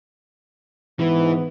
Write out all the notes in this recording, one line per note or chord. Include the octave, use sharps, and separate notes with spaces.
G#2 E3 B3